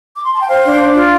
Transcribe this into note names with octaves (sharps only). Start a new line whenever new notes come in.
D6
C6
A5
G5
C5 F5
D4
D4
F4